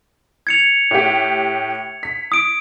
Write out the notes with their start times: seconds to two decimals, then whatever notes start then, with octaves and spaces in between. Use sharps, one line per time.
0.47 G#6 C#7 F7
0.91 A2 G4
2.03 B6
2.32 D#6 D7